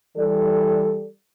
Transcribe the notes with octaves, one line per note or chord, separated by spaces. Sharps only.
E3 G3 A4 D5